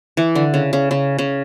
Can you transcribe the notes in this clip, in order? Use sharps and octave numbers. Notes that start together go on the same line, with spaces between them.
E3
D3
C#3
C#3
C#3
C#3